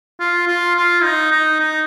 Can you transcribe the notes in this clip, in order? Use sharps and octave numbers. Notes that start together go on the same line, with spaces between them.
F4
F4
F4
D#4
D#4
D#4